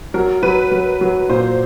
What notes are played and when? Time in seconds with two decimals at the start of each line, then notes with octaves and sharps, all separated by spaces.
0.14 F#3 A#4
0.43 F#3 B4
0.72 F#3
1.01 F#3
1.29 A#2 C5